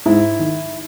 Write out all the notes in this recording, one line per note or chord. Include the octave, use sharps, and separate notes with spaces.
G#2 E4
D#3